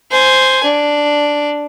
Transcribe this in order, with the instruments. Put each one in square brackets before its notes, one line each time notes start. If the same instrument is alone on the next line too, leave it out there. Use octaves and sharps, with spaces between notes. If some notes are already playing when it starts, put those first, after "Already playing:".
[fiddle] C5 G#5
D4